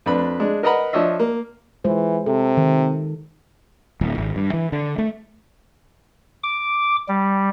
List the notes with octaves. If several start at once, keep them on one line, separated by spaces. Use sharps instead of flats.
F2 D4 B4 B5
G#3 D4
A#4 B4 D#5 F#5 A#5 B5
F3 D4 C#5 D#5 E5
A#3
E3 G#3 F4 C5
C3 A4
D#3
D1
G#1
G2
E3
D3
A3
D6
G3